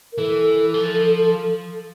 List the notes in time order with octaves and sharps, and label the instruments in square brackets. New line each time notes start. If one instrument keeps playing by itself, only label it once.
[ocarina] A#4
[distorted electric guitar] E3 [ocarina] A4
[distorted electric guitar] F3